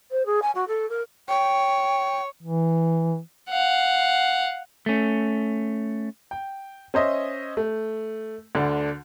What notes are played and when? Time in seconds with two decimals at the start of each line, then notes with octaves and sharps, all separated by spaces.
0.11 C5
0.25 G#4
0.42 G#5
0.55 F#4
0.68 A4
0.89 A#4
1.28 C#5 G5
2.43 E3
3.50 F5 F#5
4.86 A3 C#4
6.31 G5
6.94 C#4 C5 D#5 E5
7.57 A3
8.55 D2 D3 D4